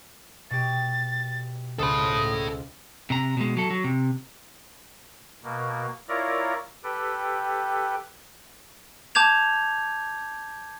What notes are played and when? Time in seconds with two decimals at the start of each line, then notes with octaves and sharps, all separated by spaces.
0.50 B2 G4 A6
1.79 C#2 A4 C5 B5 D#6
3.10 C3 A#5
3.37 B2 G#3
3.57 F#3 A4
3.71 F#3
3.84 C3
5.43 B2 A#3
6.09 E4 F4 A#4 C#5 D5 A#5
6.84 G4 A4 B4 G5
9.15 A5 D6 G6 G#6 F7